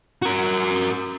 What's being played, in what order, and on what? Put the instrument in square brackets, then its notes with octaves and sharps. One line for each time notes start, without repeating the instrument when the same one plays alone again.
[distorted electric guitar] F#4 A#4